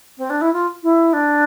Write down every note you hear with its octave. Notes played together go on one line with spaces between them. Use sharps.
C4
D4
E4
F4
E4
D4